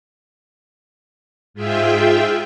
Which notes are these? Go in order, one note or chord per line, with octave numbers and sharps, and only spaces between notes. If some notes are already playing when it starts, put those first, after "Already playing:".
G#2 F4 G#4 E5 G5